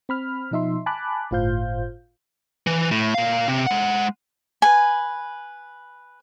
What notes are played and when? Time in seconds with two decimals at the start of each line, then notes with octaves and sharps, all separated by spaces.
0.09 C4 B5 F6
0.51 B2 F3 D#4 E5 C6
0.86 G#5 A5 B5 D6 F#6
1.31 G1 A2 F4 C5 F5 G6
2.67 E3
2.91 A2
3.14 A#2 F5
3.48 C3
3.66 G#3 F#5
4.62 B4 G#5